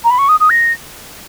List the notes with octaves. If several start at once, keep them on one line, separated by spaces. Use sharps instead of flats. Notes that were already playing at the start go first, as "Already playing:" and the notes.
A#5
B5
C#6
D#6
D#6
A#6